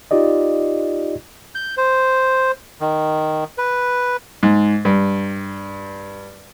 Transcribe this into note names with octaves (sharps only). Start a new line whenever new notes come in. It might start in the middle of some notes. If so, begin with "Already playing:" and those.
D#4 F4 G4 D5 D#5
G6
C5
D#3
B4
G#2
G2